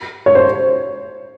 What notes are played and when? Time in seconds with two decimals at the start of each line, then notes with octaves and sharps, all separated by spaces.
0.26 C#5
0.35 C5